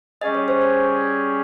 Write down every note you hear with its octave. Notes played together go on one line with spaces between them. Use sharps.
G3 C#4 G#4 D#5
C#5
C5
C#5